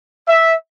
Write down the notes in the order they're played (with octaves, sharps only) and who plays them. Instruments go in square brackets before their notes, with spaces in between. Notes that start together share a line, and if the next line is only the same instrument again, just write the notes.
[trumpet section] E5